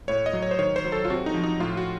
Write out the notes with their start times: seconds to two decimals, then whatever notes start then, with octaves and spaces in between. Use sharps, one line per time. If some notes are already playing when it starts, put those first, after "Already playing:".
0.08 A2 C#5
0.26 D#5
0.33 F#3
0.43 C#5
0.51 C5
0.59 D#3 C#5
0.76 C5
0.85 F#3
0.92 A4
1.05 F4
1.10 C3 F#4
1.26 D#4
1.34 F3
1.43 D#4
1.60 A2 F4
1.77 F#4